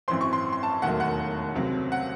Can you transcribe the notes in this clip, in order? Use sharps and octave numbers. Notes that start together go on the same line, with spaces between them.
G#1 F#2 E3 C4 C6
C#6
C6
C6
A5
E1 D#2 D#3 F#3 A3 F#5
F#5
C#2 C3 F#3 C4
F#5